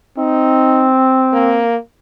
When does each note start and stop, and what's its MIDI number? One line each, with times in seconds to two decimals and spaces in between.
0.18 1.66 60
0.18 0.89 63
1.33 1.76 58